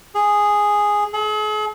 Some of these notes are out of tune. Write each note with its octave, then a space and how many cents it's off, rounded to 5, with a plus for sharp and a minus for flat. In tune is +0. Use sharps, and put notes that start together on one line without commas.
G#4 -5
G#4 +45